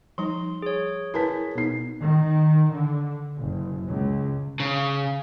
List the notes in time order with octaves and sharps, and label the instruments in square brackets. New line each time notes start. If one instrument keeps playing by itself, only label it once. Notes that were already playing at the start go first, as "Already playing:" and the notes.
[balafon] F3 G3 D#4 [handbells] C6
[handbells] G#4 C#5
[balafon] E4 A#4 B4 [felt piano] G#5 A5 B6
[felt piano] B2 D#4 C7
[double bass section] D#3
D3
F#1
C#2
[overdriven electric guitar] C#3